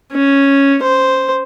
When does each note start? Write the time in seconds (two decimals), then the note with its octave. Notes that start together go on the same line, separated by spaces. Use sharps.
0.12 C#4
0.83 C5